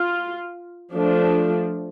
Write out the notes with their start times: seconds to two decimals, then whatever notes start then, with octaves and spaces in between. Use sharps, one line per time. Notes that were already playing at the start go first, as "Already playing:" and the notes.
Already playing: F4
0.95 F3 A3 D4